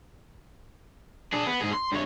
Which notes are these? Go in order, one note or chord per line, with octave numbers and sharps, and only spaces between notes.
D4 G#4
B3
G#2 G#4
C6
G2 C#5